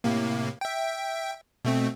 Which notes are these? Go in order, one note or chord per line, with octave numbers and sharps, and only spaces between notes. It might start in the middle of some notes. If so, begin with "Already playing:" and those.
A2 C3 A#3
E5 G5
B2 A3 C4